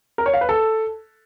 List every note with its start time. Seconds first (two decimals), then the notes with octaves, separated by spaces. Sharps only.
0.18 A#4
0.26 C#5
0.34 F5
0.41 B4
0.49 A4